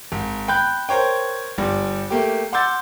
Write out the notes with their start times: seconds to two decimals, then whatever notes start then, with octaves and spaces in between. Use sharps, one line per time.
0.12 G#1
0.48 G5 B5 F#6 G6
0.89 A#4 C5 C#5 G5
1.58 G1 G3
2.10 A3 A#3 G4
2.53 F#5 C6 D6 E6 G6 A6